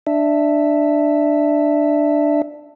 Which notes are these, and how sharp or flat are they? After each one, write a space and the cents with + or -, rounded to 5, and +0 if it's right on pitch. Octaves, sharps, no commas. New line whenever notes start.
D4 +10 E5 +0